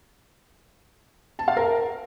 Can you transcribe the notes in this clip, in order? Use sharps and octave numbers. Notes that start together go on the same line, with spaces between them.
A5
F5
A#4